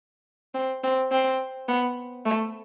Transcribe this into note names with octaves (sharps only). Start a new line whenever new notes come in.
C4
C4
C4
B3
A3